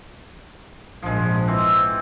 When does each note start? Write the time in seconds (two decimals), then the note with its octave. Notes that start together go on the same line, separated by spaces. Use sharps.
1.03 A#1 G#2 F3 G#3
1.48 E3 C4